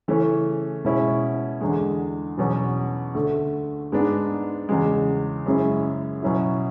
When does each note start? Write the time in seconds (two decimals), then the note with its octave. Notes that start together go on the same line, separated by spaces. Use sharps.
0.08 C#3 E3 A3 C#4
0.85 B2 G#3 C#4 E4
1.61 E2 D3 G#3
2.38 E2 B2 F#3 C#4
3.15 D2 D3 A3
3.92 G#2 G#3 B3 D4
4.69 E2 C#3 G#3
5.46 F#2 C#3 G#3 C#4 E4
6.23 B2 F#3 C#4 E4